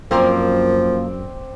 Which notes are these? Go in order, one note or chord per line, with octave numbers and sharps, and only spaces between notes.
F#2 F3 A#3 C4 A#4 C5 D5